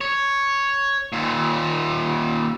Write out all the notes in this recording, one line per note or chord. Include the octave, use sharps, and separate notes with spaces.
C#5
D#2 A#2